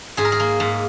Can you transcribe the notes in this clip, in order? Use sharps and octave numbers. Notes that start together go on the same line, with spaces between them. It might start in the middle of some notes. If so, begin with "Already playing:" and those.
G#2 G#4
A#4
G#4
A#3
G#2